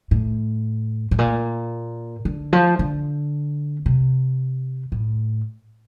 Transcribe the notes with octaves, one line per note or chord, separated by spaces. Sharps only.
A2
A2
A#2
D3
F3
D3
C3
A2